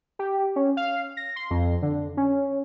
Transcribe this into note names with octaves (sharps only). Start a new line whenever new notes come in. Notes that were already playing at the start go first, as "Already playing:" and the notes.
G4
C#4
F5
A#6
C6
F2
D3
C#4